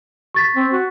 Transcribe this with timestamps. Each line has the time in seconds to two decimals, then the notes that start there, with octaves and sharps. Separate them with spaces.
0.34 C#6 A6 B6
0.56 C4
0.73 F#4